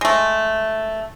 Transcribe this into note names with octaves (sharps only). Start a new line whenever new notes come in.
G#3 A3